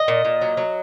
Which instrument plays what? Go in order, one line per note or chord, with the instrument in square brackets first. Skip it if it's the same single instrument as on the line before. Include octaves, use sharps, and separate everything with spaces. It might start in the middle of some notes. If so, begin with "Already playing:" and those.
Already playing: [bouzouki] D#5
A#2
A#2
F#3
F#3